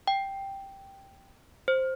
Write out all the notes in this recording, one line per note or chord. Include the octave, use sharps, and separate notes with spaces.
G5
C5